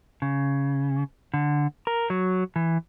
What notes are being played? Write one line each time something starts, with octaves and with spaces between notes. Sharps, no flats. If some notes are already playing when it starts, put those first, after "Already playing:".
C#3
D3
A#4
F#3
E3